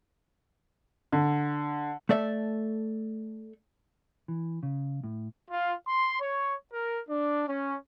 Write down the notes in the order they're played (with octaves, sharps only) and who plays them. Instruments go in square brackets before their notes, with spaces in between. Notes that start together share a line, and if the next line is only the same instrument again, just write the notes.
[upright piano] D3
[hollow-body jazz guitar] A3 A4 D5 E5
[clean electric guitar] E3
C#3
A2
[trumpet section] F4
C6
C#5
A#4
D4
C#4